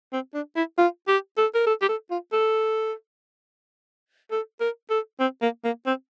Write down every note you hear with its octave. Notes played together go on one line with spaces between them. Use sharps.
C4
D4
E4
F4
G4
A4
A#4
A4
G4
A4
F4
A4
A4
A#4
A4
C4
A#3
A#3
C4